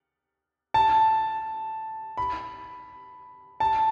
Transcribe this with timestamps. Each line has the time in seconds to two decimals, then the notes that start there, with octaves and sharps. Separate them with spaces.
0.74 A5
2.17 B5
3.60 A5